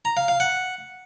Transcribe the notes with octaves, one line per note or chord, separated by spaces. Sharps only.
A#5
F5
F5
F#5